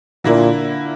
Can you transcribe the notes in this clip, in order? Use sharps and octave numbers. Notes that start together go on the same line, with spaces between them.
A#2 D3 A#3 E4